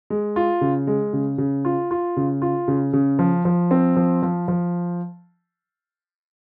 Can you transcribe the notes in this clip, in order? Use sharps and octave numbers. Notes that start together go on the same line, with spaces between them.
G#3
F4
C#3
G#3
C#3
C#3
F4
F4
C#3
F4
C#3
C#3
F3
F3
C4
F3
F3
F3